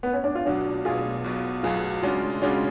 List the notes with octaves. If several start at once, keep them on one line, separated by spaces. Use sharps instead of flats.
B3
C#4
D4
F4
B1 B2 F#3 D4 F#4
B1 B2 F#3 F4 G#4
B1 B2 F#3
B1 B2 F#3 F4 G#4
C#3 G#3 C#4 D4 F4 F#4
C#3 G#3 C#4 D4 F4 F#4